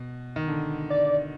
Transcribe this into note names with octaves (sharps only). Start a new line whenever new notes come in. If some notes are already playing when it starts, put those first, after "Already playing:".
Already playing: B2
D#3
D3
D5